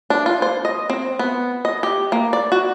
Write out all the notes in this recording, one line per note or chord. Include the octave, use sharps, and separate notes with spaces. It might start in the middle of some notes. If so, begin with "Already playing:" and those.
D4
F4
C5
D#5
C4
B3
D#5
G4
A#3
D5
F#4